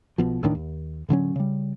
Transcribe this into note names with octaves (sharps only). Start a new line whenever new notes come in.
B1 B2 F3
C#2 A2 D#3 D4
D#2
A2 D3 F#3 C#4
C#3 G3